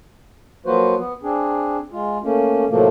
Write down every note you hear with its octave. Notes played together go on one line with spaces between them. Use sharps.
F3 F#3 A#3 F#4 B4 C5
B3
C4 D4 G#4
G#3 F4
A3 A#3 C#4
A2 C3 F3 F#3 A3 A#3